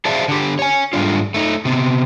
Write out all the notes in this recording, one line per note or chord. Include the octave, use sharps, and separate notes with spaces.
G#4 C5 D5 E5 F5 A5
D3 G4
C#5 G#5
G#2 D#3 G3 A3 D4 F4
A3 D#4
C3 B3 C4